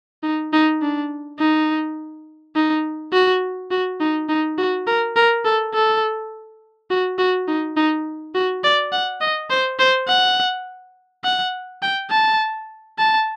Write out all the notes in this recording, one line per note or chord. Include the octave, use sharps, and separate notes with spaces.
D#4
D#4
D4
D#4
D#4
F#4
F#4
D#4
D#4
F#4
A#4
A#4
A4
A4
F#4
F#4
D#4
D#4
F#4
D5
F#5
D#5
C5
C5
F#5
F#5
G5
A5
A5